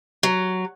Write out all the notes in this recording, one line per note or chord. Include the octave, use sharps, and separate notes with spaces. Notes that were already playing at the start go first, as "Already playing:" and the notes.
F#3